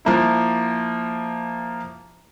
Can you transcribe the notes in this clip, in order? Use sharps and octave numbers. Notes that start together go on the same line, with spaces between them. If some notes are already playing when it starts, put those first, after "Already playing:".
F3 A#3 E4